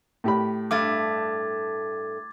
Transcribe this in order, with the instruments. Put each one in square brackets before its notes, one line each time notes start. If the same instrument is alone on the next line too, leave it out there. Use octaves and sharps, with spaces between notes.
[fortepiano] A2 G4 B5
[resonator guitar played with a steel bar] G2 A3 [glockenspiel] D6 G#6 A6